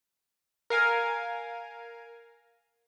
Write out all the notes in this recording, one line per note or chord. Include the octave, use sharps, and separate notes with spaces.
A#4 F5 G#5